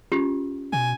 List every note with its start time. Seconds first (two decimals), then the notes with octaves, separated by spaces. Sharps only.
0.12 C#4 F4 G4
0.73 B2 G#5